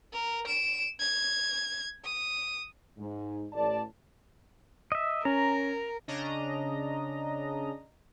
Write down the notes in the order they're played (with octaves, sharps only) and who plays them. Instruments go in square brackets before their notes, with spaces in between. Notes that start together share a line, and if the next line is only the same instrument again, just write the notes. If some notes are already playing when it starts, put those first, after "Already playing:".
[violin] A#4
D7 E7
G#6
D#6
[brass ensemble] G#2
A1 D5 A5
[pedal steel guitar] D#5 E5
[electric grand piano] C#4 [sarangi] A#4 [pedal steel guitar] A#5
[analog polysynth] C#3 C#4 D4 D#5 A#5